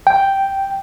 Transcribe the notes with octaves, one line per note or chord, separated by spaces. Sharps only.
G5